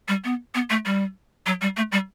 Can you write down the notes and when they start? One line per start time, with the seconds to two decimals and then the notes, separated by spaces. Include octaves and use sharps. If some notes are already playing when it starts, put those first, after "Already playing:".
0.08 G3
0.24 B3
0.55 B3
0.70 A3
0.85 G3
1.46 F#3
1.61 G3
1.77 A3
1.92 G3